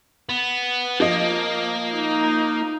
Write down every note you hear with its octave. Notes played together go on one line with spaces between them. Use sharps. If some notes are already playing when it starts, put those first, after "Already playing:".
B3
F3 A#3 D#5
D#4